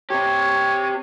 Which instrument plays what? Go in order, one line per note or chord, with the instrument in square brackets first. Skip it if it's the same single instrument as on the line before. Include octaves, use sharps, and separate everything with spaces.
[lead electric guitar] C4 G4 [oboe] C#5